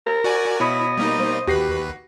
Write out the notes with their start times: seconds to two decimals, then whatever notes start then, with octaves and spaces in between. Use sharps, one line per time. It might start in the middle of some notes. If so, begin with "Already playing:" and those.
0.06 A#4
0.24 F#4 D5 G#5
0.60 B2 E4 C#5 D#5 B5
0.98 G3 A#3 D#4
1.20 C5
1.47 D#2 F#4 G4 B4 A#6 C7